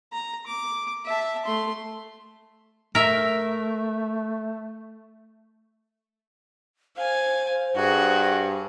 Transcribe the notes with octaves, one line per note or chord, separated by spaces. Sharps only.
A#5
D6
E5 A5
A3 C6
A3 A#4 E5
C5 F5 G#5
G2 F#4 G#4